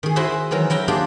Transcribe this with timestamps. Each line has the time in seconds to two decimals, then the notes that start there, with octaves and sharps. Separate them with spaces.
0.03 D#3 G#4
0.16 E4 F#4 G#4 C5 D#5 E5
0.51 D#3 E3 F#3 A#4
0.70 F#3 E4 G5 A#5
0.88 A#3 D4 F4 G4 G#4